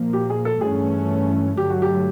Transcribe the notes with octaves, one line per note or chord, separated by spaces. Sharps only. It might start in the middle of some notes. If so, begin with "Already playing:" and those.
Already playing: A#2 F3 A#3
G4
G#4
A4
G2 E3 A3 C#4 G#4
G2 D3 F#3 A3 G4
F#4
G4